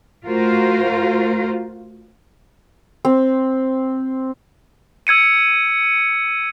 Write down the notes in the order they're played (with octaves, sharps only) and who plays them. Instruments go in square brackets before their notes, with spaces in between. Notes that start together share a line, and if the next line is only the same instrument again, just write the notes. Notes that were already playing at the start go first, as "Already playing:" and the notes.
[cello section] A3 F4 F#4 A#4 C5
[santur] C4
[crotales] E6 G#6 C#7 D#7